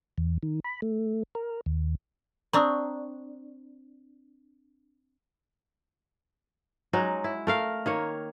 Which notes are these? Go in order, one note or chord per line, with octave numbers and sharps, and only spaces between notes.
E2
D#3
B5
A3
A#4
D#2
C4 D4 A#5 C#6 D#6
F#3 G#3 D#4
E4
A3 A#4 F5
D#3 A#3 C#5